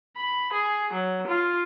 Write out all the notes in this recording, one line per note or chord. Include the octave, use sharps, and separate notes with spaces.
B5
G#4
F#3
F4